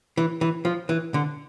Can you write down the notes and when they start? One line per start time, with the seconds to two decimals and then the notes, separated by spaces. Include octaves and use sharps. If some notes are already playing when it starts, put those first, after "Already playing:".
0.17 E3
0.41 E3
0.65 F3
0.89 E3
1.14 D3